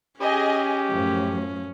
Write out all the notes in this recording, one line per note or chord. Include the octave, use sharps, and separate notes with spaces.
C#4 G4 G#4 D#5 G#5
F#2 A2 F3